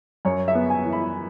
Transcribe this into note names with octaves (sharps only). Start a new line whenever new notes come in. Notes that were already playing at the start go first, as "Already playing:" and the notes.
F#2 C#5
E5
B3
G#5
E3
B5